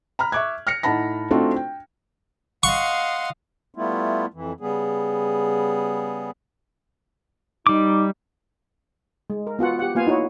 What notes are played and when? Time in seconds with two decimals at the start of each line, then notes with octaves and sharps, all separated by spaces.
0.19 A#5 B5 F6
0.32 E5 C#6 D6 F#6 G#6
0.67 F6 A#6 C#7
0.83 A2 D#4 F#5 A5 B5 A#6
1.31 A3 C4 D4 D#4 F4 F#4
1.56 G5
2.63 D#5 F5 F#5 C6 C#6
3.75 G3 A3 B3 E4 F4
4.34 F2 E3
4.60 C#3 G3 B3 G#4
7.67 G3 D#4 D6
9.30 G#3
9.47 A#4
9.59 B3 F4 F#4 F#5
9.79 G4 F#5
9.95 A#3 B3 F4 F5 G#5
10.07 D#4 E4 F#4 C#5